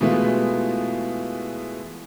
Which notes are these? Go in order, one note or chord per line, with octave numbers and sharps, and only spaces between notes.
B2 E3 G#3 A3 B3 F4